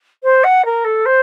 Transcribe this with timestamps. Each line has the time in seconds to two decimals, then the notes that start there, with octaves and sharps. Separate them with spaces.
0.23 C5
0.44 F#5
0.65 A#4
0.84 A4
1.06 C5